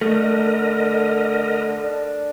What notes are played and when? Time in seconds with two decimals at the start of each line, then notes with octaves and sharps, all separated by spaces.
0.01 D3 A3 A#4 D#5
1.84 D4